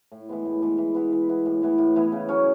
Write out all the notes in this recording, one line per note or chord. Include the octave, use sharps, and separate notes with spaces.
A2
E3 G#3 B3
A2
E3 G#3 B3
E3
B3 E4
E3
B3 E4
A2
E3 B3 E4
A2
E3 B3 E4
C#3
F#3 C#4 F#4